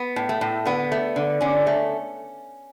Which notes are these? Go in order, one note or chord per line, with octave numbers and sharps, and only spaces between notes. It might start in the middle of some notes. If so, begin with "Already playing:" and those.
Already playing: B3
A2
A3
A2
D3 B3
A3
D3
D3 C#4
A3